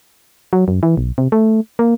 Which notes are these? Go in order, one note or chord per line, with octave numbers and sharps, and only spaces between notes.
F#3
F#2
E3
B1
C3
A3
A#3